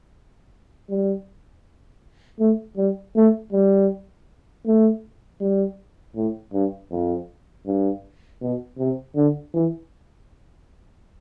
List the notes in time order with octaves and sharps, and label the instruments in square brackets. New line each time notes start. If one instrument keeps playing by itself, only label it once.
[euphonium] G3
A3
G3
A3
G3
A3
G3
A2
G2
F2
G2
B2
C3
D3
E3